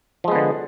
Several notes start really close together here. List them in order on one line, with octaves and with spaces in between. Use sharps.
F3 G#3 B3 D3